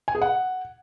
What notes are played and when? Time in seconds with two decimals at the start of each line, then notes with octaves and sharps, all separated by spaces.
0.08 G#5
0.15 G#4
0.22 F#5